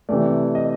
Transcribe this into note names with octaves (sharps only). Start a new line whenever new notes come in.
C3 E3 A3 D5
D#5